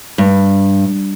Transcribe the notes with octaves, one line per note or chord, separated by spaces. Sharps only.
G2